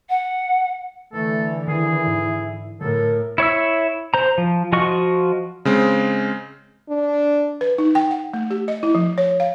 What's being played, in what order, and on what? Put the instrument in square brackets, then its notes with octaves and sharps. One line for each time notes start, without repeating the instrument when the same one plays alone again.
[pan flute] F#5
[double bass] D3 E3 [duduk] A3 [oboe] A4
[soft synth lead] D#3 [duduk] E4 [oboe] G#4
[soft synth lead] G#2
[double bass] A2 [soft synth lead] D3 [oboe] A4 [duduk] A#4
[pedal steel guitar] E4 C#5 E5 E6
C5 A#5
F3
F3 F4 F#4 D#5 C#6
[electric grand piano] C#3 G#3 C4
[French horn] D4
[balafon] B4
D#4
G5
F#5
A3
G4
D#5
E4
F3
C#5
F5